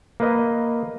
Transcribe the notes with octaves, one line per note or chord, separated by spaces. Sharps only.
A#3 B4 D#5